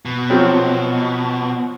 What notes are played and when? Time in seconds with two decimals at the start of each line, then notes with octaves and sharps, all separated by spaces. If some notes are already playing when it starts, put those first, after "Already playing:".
0.05 B2
0.30 F3 F#3 C4